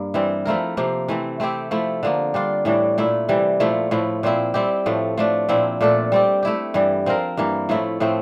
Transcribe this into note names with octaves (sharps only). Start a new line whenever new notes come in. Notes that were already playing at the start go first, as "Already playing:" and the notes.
Already playing: G2 A#3
E3 G3 C4
F3 A3 E4 A#4
C3 F3 A#3
E3 A3 C4
A3 C4 E4 G4
F3 A3 E4
D3 F3 A#3
G3 D4 F4
A2 E3 G3 D4
A#2 A3 E4
C3 E3 G3
A#2 F3 A3 E4
A2 F3 A3 E4
A#2 F3 C4 E4
G3 C4 E4 G4
A2 F3 A3
F3 A3 D4
A#2 F3 C4 E4
A#2 A3 D4 A4
G3 C4 G4
A3 E4 G4
G2 E3 G3
F3 C4 F4 A#4
G2 E3 A#3
A2 F3 A3 E4
A2 F3 A3 C4